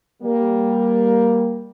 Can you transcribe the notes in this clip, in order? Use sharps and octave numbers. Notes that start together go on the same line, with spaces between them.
G3 A#3